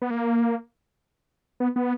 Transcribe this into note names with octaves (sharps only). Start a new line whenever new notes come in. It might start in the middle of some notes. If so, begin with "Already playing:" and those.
B3
A#3
B3
B3